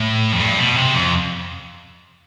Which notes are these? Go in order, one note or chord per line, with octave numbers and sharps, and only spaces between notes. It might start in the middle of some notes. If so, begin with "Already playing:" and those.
Already playing: A2
F2
G2
B2
C3
F2